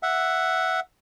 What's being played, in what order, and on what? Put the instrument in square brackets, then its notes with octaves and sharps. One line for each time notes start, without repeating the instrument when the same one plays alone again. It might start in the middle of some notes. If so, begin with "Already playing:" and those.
[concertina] E5 F#5